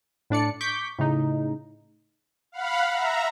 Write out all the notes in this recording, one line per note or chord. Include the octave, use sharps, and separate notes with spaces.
A2 D4 D5 C#7
C#6 D6 G6 B6
A2 C#3 D#4
F5 F#5 B5
E5 A#5